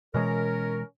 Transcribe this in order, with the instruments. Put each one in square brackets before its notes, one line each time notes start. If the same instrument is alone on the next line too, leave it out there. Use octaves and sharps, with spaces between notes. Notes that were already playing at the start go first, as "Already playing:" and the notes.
[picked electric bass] B2 E3 G#3 [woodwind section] C#4 A#4